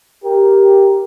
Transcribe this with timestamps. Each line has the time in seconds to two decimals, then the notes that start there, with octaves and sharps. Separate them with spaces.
0.24 G4 A#4